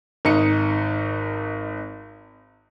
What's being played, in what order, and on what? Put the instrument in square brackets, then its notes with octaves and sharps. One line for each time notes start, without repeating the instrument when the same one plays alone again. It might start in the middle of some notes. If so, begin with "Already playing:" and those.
[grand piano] G#1 D#4 C#7